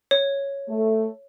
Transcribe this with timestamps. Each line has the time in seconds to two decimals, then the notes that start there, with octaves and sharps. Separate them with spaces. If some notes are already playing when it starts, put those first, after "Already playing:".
0.11 C#5
0.69 A3